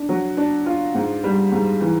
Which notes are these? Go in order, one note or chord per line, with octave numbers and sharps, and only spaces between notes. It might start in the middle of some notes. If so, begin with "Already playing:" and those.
Already playing: D4
F#3
D4
F4
G#2
G3
G#2
E3